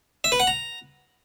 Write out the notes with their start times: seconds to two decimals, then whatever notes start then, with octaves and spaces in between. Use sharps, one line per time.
0.24 E5
0.32 B4
0.40 F#5
0.47 A#5